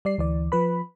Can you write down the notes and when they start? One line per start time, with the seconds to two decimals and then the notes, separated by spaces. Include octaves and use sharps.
0.05 G3 D5 C7
0.18 D2 E3 D5
0.52 F3 B4 B5